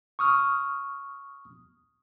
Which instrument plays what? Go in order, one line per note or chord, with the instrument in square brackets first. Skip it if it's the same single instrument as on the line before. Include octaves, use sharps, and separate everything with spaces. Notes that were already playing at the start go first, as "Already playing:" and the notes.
[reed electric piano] C#6 D#6 F6